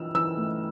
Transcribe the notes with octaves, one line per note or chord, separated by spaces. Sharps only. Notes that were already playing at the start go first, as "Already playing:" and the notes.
Already playing: E3 D4 F4 E6 F6
E3 E6
A3